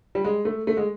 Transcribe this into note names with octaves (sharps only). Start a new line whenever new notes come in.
G3
G#3
A3
A3
G#3